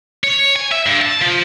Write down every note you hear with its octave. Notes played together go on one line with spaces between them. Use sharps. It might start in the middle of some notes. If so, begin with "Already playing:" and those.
C#5
G#5
E5
G2
A5
F3